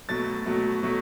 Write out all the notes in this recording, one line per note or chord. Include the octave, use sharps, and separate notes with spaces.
B2 F#3 A3 A6
B2 F#3 A3
B2 F#3 A3